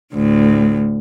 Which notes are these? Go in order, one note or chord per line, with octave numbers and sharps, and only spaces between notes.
D2 A2